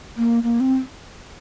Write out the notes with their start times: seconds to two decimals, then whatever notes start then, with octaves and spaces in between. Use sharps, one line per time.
0.17 A#3
0.43 A#3
0.60 C4